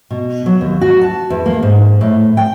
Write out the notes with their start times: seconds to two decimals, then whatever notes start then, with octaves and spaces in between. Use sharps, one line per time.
0.11 B2
0.46 F#3
0.61 D#2
0.81 F#4
1.01 A5
1.30 E2
1.46 A#3
1.63 G#2
2.01 A2
2.37 G5